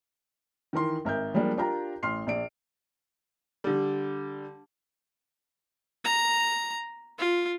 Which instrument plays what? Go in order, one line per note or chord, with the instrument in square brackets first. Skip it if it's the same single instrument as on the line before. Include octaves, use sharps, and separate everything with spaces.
[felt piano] D#3 E3 A#4 C6
G#1 A#4 E5 G6
F3 G3 G#3 A#3 D4
D4 F4 G4 A#4 G5 A#5
A1 C6 F6 C7
A#1 D5 D7
[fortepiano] D3 G3
[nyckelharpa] A#5
F4